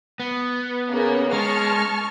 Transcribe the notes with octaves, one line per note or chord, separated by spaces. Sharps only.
B3
C#3 A#3 C#4
G#3 A5 C#6 F6